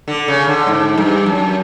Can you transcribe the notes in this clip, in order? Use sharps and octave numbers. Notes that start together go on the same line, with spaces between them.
D3
C#3
D3
G#2
G2
F#2